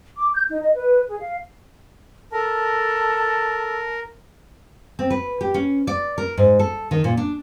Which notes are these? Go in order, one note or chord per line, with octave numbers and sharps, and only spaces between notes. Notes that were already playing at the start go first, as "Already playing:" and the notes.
D6
G6
D#4
D#5
B4
G#4
F5
A4 A#4 A5
C4
B4
G4
C#4
D5
A#4
G#2
A4
D#3
A#2
D4